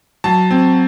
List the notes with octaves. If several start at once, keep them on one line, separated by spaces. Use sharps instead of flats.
F#3 A5
C4